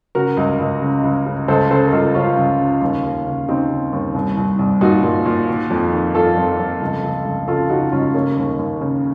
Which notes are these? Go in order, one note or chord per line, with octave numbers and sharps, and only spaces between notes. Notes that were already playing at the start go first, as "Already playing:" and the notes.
C#3 F#4 A#4
C#2
C#2
C#3
C#2
C#3
C#2 A4 C5
C#3 A4 C5
A#4
C#2 F4 A4
C#2 C#4 F4
C#2
C#3
D#2
D#2
C#3
C#3 C4 D#4
C#3
D#2
C2
C2
C2
A#2 D#4 F#4
A#2
A#2
D#3
F2
D#3
F2 F4 A4
F2
F2
C#2
C#2
C#2
C#3 F4 A4
C#3 D#4 F#4
C#2 C#4 F4
C#3 A#3 C#4
D#2
D#2
C#3